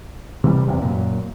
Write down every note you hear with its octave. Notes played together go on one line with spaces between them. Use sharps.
C3 E3 F3 G3
F#1 E2 C3
F#2 A#2